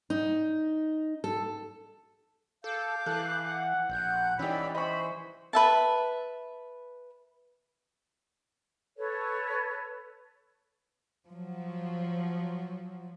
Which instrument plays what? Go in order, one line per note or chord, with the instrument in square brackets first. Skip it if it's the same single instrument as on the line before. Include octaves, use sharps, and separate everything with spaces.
[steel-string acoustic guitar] D#4
A4
[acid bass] A4 [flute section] F5 D6 G6
[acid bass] E3 [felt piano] A4 [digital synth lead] F#6
[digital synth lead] F#5
[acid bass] A#1 [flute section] F#6 G6
[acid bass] E3 [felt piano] C#4 D#4 G4 [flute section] D5 B5 E6
[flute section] C5 [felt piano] D#5 C#6 [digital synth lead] B5
[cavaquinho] B4 E5 A5
[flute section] A4 B4 C#5
[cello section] F3 F#3